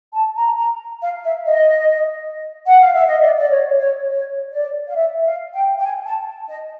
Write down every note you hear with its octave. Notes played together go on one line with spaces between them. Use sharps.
A5
A#5
A#5
F5
E5
D#5
F#5
F5
E5
D#5
D5
D5
C#5
C#5
C#5
D5
F5
E5
F5
G5
G5
G#5
A5
D#5